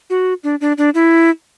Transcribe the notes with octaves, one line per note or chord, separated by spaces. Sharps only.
F#4
D4
D4
D4
E4